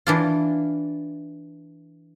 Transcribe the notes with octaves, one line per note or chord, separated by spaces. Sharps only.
E3 D4 F4